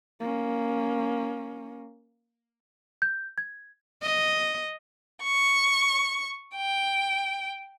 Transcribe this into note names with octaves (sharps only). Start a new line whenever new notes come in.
A#3 C#4
G6
G#6
D#5
C#6
G5